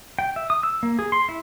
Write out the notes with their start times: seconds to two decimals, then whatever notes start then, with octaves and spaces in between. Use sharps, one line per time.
0.19 G5
0.36 E5
0.50 D#6
0.63 E6
0.83 A#3
0.99 G#4
1.12 C6
1.29 E4